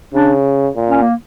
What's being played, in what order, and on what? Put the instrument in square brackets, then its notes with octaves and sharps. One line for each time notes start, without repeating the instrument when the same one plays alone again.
[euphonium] C#3 [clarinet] D4
[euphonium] A#2
[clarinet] C#4
A#3